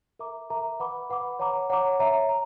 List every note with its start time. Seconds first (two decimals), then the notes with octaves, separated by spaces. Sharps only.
0.19 A#4 E5 A#5 D6
0.50 A#4 E5 A#5 D6
0.80 B4 F#5 B5 D6
1.10 B4 F#5 B5 D6
1.39 C#5 F#5 A#5 D6
1.70 C#5 F#5 A#5 D6
1.99 C#5 E5 A#5
2.29 A#5